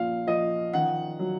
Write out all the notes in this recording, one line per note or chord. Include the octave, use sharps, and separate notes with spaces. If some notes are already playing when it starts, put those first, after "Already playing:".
Already playing: A#2 F3 F5
F3 D#5
D#3 F#5
F#3